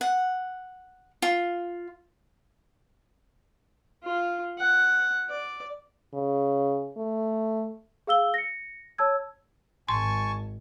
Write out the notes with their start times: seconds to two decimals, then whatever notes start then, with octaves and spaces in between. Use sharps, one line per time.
0.01 F#5
1.22 F4
4.04 F4
4.59 F#5
5.30 D5
6.13 C#3
6.97 A3
8.07 G#4 F5 E6 G7
8.34 A#6 C#7
8.98 C#5 A5 E6 G#6
9.89 G#1 G#5 A5 C6 C#6